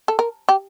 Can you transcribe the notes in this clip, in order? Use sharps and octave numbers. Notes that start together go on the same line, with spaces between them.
A4
A#4
G4